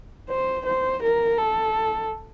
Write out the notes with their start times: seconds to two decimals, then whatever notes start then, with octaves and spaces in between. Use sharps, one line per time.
0.29 C5
0.66 C5
1.03 A#4
1.39 A4